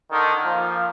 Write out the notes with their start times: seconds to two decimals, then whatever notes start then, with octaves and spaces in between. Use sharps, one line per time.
0.11 D3 D#3
0.44 A#2 F3